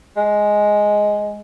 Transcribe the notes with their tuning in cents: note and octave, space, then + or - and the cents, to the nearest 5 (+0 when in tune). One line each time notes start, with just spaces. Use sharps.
G#3 +5